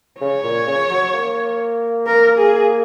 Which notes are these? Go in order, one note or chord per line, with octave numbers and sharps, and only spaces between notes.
C#3 C#5
A#2
C#3
F#3
A#3
A#4
G#4